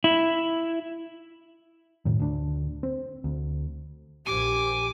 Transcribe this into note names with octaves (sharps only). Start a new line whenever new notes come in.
E4
F2 A2 D#3
D2 D4
C4
D2
A#1 F3 G4 G#5 D6